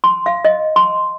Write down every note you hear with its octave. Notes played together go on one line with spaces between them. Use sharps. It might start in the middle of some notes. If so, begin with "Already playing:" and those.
C6
F5
D#5
C6